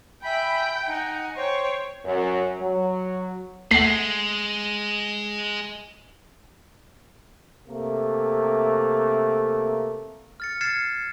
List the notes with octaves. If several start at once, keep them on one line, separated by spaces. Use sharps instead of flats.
E5 G5 G#5 B5
D#4 F#5 G#5
C5 C#5 G5
F#2
F#3
G#3 A3 F#5 C7
C3 A3 A#3
F6 A6 C#7
F6 G#6 A6 C7 C#7 E7